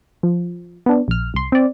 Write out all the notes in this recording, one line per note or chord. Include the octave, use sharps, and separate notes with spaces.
F3
B3 D4
A#1 F6
C2 C6
C4 D5